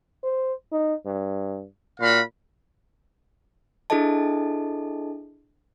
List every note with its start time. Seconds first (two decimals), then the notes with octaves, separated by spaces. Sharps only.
0.24 C5
0.72 D#4
1.06 G2
2.00 A#2 F#4 F5 B5
3.90 D4 E4 G#4 A4 D#5 A5